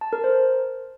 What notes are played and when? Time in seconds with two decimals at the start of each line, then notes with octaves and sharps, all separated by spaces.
0.01 A5
0.13 A#4
0.24 C5